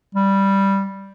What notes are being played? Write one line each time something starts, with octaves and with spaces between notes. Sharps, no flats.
G3